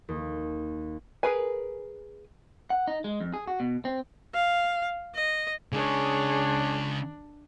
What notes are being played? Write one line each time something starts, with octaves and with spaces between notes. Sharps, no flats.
D#2
G#4 A#4 B4 G#5
F#5
D#4
G#3
F2
G#4
F#4
B2
C4
F5
D#5
C#3 G#3 D4 G#4 C#5